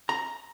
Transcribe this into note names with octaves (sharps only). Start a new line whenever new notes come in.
A#5